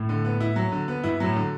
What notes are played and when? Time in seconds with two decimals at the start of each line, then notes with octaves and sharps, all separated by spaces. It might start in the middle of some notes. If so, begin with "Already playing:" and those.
Already playing: A2
0.09 D3
0.25 B3
0.40 E4
0.56 F#3
0.72 D3
0.88 B3
1.04 G2 E4
1.20 A2 F#3
1.36 D3